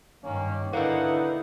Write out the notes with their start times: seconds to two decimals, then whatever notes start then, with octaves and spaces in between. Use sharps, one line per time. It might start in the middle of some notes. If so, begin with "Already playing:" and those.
0.24 G2 D#3 A#3 C#4
0.73 D3 A#3 D#4 E4 B4 F#5